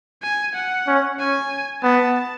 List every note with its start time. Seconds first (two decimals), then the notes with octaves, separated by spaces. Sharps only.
0.22 G#5
0.55 F#5
0.87 C#4
1.19 C#4 G#5
1.83 B3 A5